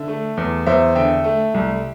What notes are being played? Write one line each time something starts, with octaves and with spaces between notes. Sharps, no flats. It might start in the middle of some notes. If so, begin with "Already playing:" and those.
Already playing: D3 E5
A3
E2
E2 C5 E5
D3 E5 G5
A3
C2